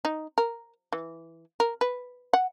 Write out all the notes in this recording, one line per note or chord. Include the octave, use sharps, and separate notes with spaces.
D#4
A#4
E3
A#4
B4
F#5